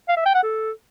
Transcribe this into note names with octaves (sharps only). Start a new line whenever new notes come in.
F5
E5
G5
F#5
A4